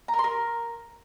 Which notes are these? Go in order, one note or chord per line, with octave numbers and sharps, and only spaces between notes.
A#5
A#4
C6
A#4